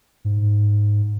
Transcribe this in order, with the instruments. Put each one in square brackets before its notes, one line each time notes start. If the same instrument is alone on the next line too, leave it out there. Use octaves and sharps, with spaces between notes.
[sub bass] G#2